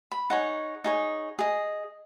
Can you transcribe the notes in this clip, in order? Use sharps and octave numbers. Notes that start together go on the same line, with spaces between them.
B5
D#4 G#4 C#5 F#5
D#4 G#4 C#5
G#4 D#5